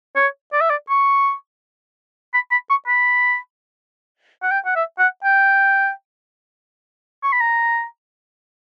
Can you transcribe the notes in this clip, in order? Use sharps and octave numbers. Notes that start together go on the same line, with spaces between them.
C#5
D5
E5
D5
C#6
B5
B5
C#6
B5
F#5
G5
F#5
E5
F#5
G5
C#6
B5
A#5